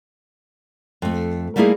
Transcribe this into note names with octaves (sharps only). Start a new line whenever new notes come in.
F2 A3
G3 A3 A#3 D#4 E4 G#4